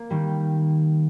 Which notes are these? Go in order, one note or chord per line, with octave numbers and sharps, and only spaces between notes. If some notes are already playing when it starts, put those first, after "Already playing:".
Already playing: A#3
D#3 G3